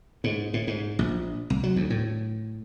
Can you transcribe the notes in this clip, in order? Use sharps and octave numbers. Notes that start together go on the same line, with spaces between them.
G#2
A2
G#2
A#1
C2
F#3
D2
A2